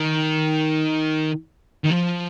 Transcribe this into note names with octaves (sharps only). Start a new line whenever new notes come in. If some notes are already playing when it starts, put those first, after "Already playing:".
Already playing: D#3
D#3
F3